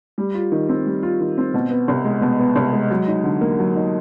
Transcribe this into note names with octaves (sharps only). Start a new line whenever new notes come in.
G3
F4
D#3
C4
G3
F4
D#3
C4
B2
B3
C2
G#3
B2
B3
C2
G#3
F#3
D#4
D3
A#3
F#3
D#4